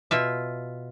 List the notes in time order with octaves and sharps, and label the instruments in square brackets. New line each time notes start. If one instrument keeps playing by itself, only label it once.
[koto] B2 F4 E5